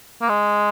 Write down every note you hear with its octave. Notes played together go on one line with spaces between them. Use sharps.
A#3
G#3